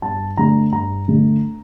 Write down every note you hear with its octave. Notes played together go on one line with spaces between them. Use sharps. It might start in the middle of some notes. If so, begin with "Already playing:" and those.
G2 A5
D3 A3 D4 A#5
G2 A#5
D3 A3 D4